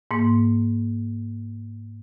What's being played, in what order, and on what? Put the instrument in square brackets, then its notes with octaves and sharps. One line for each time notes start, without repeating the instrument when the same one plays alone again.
[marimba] G#2 A#3